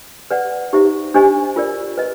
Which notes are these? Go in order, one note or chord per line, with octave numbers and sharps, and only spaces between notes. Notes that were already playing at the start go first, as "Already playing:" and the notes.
B4 D5 F#5
D#4 G4 C5 E5
D4 G4 C5 D#5 G#5
F4 A#4 D5
B4 D#5